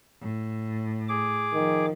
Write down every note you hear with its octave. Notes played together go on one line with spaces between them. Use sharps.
A2
G#4 D6
D#3 F3